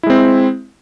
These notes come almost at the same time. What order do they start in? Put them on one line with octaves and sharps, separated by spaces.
E4 G#3 C4